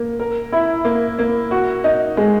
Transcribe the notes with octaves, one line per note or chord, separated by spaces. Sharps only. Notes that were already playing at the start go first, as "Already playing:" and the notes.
Already playing: A#3
A#4
E4
A#3
A#3
F#4
D#4
G#3